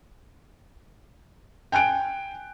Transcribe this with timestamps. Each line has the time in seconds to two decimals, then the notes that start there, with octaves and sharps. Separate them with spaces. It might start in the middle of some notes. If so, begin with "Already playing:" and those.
1.72 G5 G#5 F#6 D7